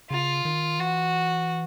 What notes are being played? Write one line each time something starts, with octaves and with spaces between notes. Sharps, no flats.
C#3 F4
D#3
E3 F#4